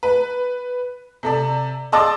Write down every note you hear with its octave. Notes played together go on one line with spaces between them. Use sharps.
B4
C3 A4 D5
D5 D#5 A5 C6 D6 E6